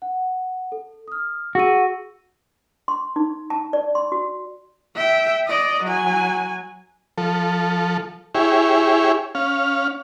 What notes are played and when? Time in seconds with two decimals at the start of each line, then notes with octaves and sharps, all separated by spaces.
0.02 F#5
0.72 A4
1.08 D#6 F6
1.55 F#4 G#4 E6 D#7
2.88 C6
3.16 D#4
3.50 A5
3.73 D5
3.95 C6
4.12 F#4
4.95 E5 G5
5.48 D5 D#5
5.83 F#3 G#5
7.18 F3 A4
8.35 E4 G4 G#4 C#5
9.35 C#4 F5